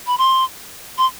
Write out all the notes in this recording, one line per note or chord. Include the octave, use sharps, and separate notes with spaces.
B5
C6
C6